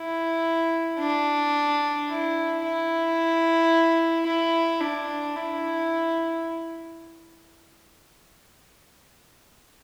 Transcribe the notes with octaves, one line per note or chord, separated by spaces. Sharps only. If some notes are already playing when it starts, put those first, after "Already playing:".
Already playing: E4
D4
E4
E4
E4
D4
E4